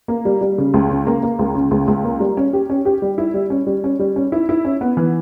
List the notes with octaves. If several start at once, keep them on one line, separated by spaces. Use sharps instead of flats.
A#3
G3
G3
C#3
C#2
C#3
A#3
A#3
C#2
C#3
C#2
C#2
A#3
G3
C#4
G4
C#4
G4
G3
E4
G3
C#4
G3
C#4
G3
C#4
E4
E4
C#4
B3
E3